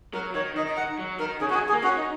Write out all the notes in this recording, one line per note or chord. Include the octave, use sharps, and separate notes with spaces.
F#3 A#4
D#3 C#5
D#3 D#5
D#5
F#5
F#3
D#3 A#4
C#3 G#4
D#3 F#4
G#4
G#4
A#3
C#4 F#4
D#4